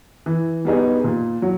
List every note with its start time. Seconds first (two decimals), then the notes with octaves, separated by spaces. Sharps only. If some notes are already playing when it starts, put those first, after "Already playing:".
0.26 E3
0.65 G3 B3 D#4 G#4
1.04 A#2
1.42 F#3